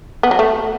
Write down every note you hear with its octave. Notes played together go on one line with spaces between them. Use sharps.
B3
F#3
A3